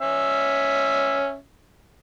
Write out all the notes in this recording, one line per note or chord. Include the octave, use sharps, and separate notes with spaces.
C#4 E5